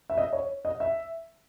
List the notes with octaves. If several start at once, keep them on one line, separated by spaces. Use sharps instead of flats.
E5
D#5
C#5
D#5
E5